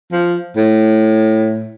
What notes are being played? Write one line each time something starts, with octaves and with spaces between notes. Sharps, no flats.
F3
A2